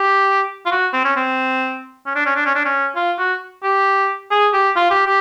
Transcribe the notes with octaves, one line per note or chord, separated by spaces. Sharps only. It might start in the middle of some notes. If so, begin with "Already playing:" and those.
Already playing: G4
F4
F#4
C4
C#4
C4
C#4
D4
C#4
D4
C#4
D4
C#4
F4
F#4
G4
G#4
G4
F4
G4
G4